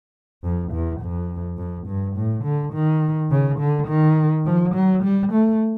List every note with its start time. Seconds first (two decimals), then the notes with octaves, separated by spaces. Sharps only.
0.44 F2
0.72 E2
1.01 F2
1.58 F2
1.87 G2
2.16 A2
2.44 D3
2.74 D#3
3.31 C#3
3.59 D3
3.88 D#3
4.46 F3
4.75 F#3
5.03 G3
5.32 A3